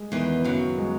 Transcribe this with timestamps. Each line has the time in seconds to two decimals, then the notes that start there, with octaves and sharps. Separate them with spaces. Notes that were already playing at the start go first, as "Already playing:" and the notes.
Already playing: G#3
0.12 E2 D#3 E3
0.44 F#2 C#3 F#3
0.78 G#3